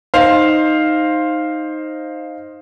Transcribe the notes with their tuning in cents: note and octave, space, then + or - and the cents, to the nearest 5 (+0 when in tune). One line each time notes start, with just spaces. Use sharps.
D#4 +0 C5 +10 F5 +0